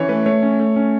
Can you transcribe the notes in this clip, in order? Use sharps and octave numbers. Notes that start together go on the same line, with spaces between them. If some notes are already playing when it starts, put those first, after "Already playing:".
Already playing: E3 C#4 C#5
A3 B4
A3 C#5
C#4
A3
C#4